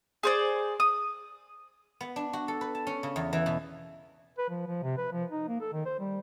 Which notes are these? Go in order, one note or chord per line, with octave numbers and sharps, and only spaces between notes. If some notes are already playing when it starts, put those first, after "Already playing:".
G#4 C5 D5
D#6
B3
D4
F#4
A4
B4
A5
C#4
C#3
E2
E3
B2
B4
F3
F3
C3
B4
F3
D#4
A#3
A4
D#3
C5
G3